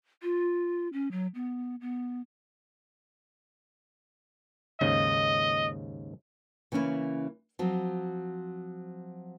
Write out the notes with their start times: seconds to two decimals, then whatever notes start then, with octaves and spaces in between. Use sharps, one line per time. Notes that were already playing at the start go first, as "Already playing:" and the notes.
0.22 F4
0.93 C#4
1.11 F#3
1.35 B3
1.81 B3
4.81 D#2 G#2 C#3 D#5
6.72 C#3 E3 A#3 C#4 E4
7.59 F3 F#3 C4